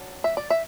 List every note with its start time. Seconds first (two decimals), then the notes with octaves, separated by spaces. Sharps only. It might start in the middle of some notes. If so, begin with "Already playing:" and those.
Already playing: F#3 D4
0.24 E5
0.37 D5
0.50 E5